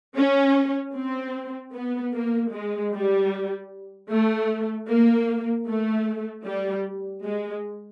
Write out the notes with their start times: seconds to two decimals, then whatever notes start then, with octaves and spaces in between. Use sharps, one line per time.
0.17 C#4
0.96 C4
1.74 B3
2.14 A#3
2.53 G#3
2.93 G3
4.10 A3
4.89 A#3
5.67 A3
6.46 G3
7.25 G#3